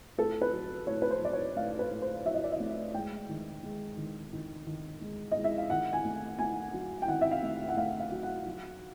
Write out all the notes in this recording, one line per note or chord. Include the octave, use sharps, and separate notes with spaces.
A2 A4
B4
F#3
A2 C#5
B4
C5
F#3 D5
C#5
A2 F5
B4
A2
C5
F#3 E5
D#5
D5
D#5
A3
G#3 G5
D#3
G#3
D#3
D#3
D#3
G#3
G#3 D#5
E5
F5
D#3 F#5
G#5
A3
A3 G#5
F#3
G5
D#3 F#5
E5
F5
A3
F#5
A3 F5
F5
F#3
F#5
F#3